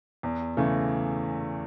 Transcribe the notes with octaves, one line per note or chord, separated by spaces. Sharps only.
E2
C#3 E3 A3